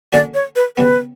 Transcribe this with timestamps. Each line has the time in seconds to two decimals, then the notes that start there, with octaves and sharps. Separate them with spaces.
0.13 D3 A#3 C#4 F#4 D5
0.34 C#5
0.56 B4
0.77 C#3 G3 B3 B4